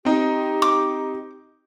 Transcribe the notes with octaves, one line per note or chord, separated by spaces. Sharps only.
C4 D#4 G4
D6